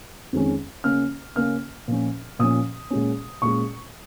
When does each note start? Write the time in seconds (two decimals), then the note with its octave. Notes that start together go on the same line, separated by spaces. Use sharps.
0.33 F2 D#3 G#3 C#4
0.84 C#3 A#3 C#4 F6
1.35 C#3 A#3 C#4 F6
1.88 A#2 F3 C#4
2.39 A#2 F3 C#4 D#6
2.90 A#2 G#3 C#4
3.42 A#2 G#3 C#4 C#6